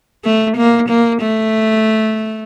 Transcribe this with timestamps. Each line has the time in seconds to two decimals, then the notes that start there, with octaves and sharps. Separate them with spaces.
0.25 A3
0.57 A#3
0.89 A#3
1.22 A3